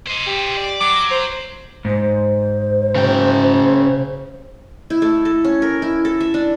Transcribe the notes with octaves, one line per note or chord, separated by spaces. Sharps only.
C5 D#5
G4
D5
F#3 D6
C5
G#2 C5
C#3 G5
E4
A3
A4
C#4
A#4
E4
A4
E5
D4